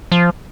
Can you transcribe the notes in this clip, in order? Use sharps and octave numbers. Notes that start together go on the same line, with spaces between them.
F3